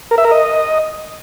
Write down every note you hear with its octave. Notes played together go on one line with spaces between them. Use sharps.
A#4
E5
A#4
D#5